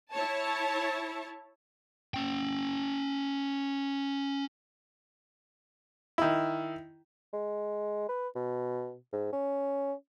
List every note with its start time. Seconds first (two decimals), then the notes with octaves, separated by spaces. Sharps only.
0.11 E4 C#5 A5
2.14 C#4 G5
6.18 D#3 E4
7.33 G#3
8.09 B4
8.35 B2
9.13 G#2
9.33 C#4